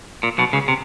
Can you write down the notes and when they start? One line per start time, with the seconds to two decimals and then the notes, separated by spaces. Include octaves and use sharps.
0.23 A#2
0.38 B1 B2
0.53 C#2 C#3
0.68 C3